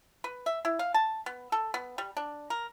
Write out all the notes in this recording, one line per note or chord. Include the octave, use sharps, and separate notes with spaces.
B4
E5
E4
F5
A5
B3
A4
B3
G3
D4
A#4